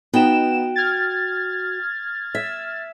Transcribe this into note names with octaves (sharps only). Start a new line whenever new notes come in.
B3 D#4 F#4 G5 E7
F6 G#6 A6
E5